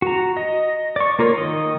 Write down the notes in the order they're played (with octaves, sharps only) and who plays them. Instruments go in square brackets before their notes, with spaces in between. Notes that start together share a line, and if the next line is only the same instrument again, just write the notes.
[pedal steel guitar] F#4 A#5
D#5
D5 C#6
A#3 F4 A#4 C#5
D#3 D#5